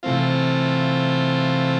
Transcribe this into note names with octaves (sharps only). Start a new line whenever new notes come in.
C3 E3 A3 C4 F4